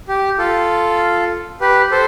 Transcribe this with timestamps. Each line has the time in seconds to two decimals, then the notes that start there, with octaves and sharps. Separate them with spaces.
0.08 G4
0.38 F4 A4
1.61 G4 B4
1.91 A4 C5